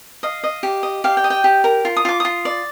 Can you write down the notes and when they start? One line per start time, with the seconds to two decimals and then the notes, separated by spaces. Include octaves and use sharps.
0.23 D#5 F5
0.44 D#5
0.63 G4
0.83 D#5
1.04 G4 F5
1.17 G5
1.24 D#5
1.30 G5
1.44 G4
1.64 A#4
1.85 F4
1.96 D#6
2.05 F4 D6
2.20 F4 D#6
2.45 D5